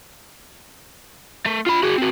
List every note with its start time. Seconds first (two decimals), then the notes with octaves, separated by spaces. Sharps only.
1.46 A3
1.67 F4 B5
1.83 F#4 G#4
1.98 C4 F#4